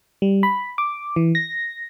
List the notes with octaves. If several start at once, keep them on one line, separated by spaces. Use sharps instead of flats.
G3
B5
D6
E3
A#6